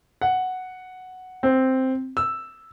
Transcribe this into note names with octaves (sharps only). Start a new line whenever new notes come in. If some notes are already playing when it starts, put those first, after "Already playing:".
F#5
C4
E6